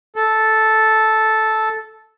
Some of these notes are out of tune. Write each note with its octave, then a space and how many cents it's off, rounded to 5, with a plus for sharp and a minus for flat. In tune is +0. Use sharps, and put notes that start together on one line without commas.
A4 -5